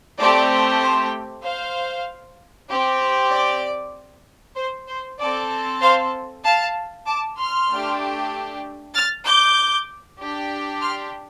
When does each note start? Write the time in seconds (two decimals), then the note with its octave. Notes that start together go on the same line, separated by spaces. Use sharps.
0.19 A3 C4 G4 D5
0.81 C5
1.44 C5 F5
2.69 C4 G4
3.31 D5
4.56 C5
4.88 C5
5.19 C4 A4 D5
5.81 C5 F5
6.44 F5 A5
7.06 A5 D6
7.37 C6 F6
7.69 A3 D4 G4
8.94 F6 A6
9.26 D6 G6
10.19 D4 G4
10.81 C6 F6